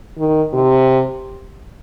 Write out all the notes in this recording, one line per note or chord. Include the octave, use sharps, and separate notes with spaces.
D#3
C3